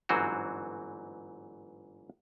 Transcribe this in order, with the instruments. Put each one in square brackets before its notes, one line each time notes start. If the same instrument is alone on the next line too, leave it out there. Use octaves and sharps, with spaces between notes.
[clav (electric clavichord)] G1 G#2 E3 F#3 C4 F#4